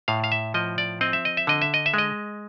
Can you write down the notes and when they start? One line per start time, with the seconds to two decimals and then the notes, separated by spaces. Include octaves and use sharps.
0.08 A2 F5
0.24 F5
0.32 E5
0.54 F3 D#5
0.78 D5
1.01 C4 D#5
1.13 E5
1.25 D#5
1.37 E5
1.47 D3 D#5
1.62 E5
1.74 D#5
1.86 E5
1.94 G#3 D#5